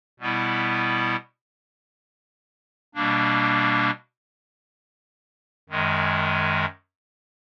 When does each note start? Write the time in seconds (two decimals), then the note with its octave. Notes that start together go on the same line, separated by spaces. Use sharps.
0.20 B2 G3 B3 E4
2.95 B2 G3 A#3 D4
5.70 F#2 D#3 G#3